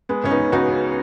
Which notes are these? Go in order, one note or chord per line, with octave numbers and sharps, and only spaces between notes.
G#3 B3
C#2 C#4
B3 D#4
C#3
C#2 D#4 F#4
C#3